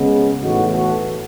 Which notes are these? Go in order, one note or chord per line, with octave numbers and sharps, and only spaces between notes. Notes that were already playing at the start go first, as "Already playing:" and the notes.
Already playing: C#3 G#3 B3
A2 E3 B3 D#4 F#4
F#4 A4